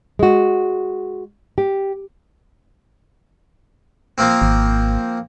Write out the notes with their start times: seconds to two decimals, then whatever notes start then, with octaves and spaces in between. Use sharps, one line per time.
0.19 G#3 F#4
1.58 G4
4.18 F3 A#3 C4
4.42 G#1